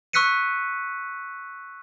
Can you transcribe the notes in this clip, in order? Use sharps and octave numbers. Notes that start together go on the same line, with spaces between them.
C#6 E6 F#6 B6 C#7 D#7